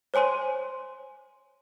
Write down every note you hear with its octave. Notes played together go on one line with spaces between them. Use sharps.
C5 C#5 G#5 C6 D#7